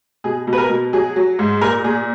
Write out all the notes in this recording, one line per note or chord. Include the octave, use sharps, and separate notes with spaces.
B2 G#4
B2
B4
A#4
B2
F#3 G#4
F#3
G#2
A#2 A#4
A#2 G#4